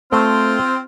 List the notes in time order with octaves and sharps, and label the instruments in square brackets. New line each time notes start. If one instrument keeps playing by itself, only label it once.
[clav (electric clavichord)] A3 [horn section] C4 [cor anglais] F4